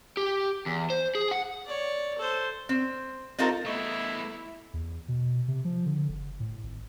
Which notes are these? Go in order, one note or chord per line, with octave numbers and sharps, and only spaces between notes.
G4
E2
C5
G#4
F#5
C#5 D5
A4 C5
C4
C4 D#4 F4 A4 A#4
A3 B3 E4 A4 D#5 C#6
E2
B2
C3
F3
D3
F#1
A2
G#1